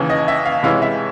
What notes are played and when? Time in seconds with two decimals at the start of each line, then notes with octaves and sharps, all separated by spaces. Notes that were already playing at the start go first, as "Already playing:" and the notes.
Already playing: D#2 C#3 E3
0.10 D#5
0.28 E5
0.45 F5
0.63 C3 E3 G#3 C#4 E4 F5
0.82 E5